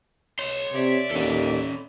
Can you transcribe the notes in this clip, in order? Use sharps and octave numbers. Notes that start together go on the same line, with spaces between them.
C#5 C6
C3 D5 E5
D#2 C#4 A4